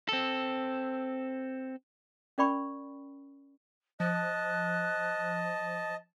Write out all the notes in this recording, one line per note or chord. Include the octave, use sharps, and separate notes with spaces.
C4 A4
C#4 A#4 D5 G5 B5 C#6
F3 D#5 A5 F#6